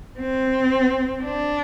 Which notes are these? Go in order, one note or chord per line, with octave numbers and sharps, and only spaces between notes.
C4
D4